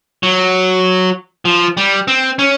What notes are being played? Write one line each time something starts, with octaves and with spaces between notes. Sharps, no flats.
F#3
F3
G3
C4
C#4